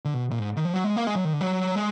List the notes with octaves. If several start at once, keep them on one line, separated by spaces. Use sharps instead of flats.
D3
B2
A#2
G#2
D#3
F3
F#3
G#3
A#3
G#3
F#3
D#3
D3
F#3
G#3